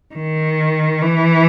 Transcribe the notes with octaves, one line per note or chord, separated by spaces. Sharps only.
D#3
E3